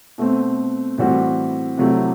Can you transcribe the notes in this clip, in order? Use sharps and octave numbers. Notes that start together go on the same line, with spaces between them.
B2 A3 C4
A2 E3 G3 C4 F#4
C3 F#3 A3 E4 G4